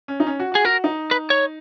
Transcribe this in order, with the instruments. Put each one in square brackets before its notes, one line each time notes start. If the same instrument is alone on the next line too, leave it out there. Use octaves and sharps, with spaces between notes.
[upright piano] C#4
D#4
C#4
F#4
[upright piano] F#4 [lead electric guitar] G#4
[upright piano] F#4 [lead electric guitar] A#4
[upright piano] D#4
[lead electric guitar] B4
C#5